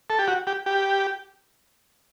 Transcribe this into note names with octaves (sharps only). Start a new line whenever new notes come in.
A4
G4
F#4
G4
G4